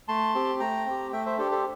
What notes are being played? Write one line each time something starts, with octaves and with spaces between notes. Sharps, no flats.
A3 A5 C6
C4 G4
A3 G5 A#5
C4 G4
A3 E5 G5
C5 E5
D4 G4 A4 C5
A4 C5